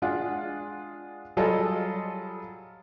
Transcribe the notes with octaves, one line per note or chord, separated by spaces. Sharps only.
G#3 D4 F4 F#5
F#3 G3 F4 G#4 A4 D#5